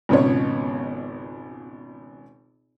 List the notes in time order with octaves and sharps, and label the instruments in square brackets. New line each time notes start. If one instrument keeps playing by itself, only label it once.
[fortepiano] G#1 C#2 B2 C#4 F4 C#5